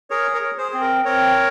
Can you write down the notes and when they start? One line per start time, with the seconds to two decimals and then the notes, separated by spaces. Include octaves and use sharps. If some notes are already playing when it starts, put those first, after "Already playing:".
0.10 G#4 A#4 C#5
0.34 A#4 C#5
0.42 G#4
0.58 G#4 C5
0.72 C4 G#4
0.81 A#4
1.05 C4 A#4 C#5